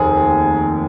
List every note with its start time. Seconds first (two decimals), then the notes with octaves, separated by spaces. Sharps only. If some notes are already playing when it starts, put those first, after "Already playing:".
Already playing: F1 D#2 G#4